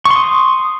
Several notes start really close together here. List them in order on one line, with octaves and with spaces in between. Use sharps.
C#6 C6 D#6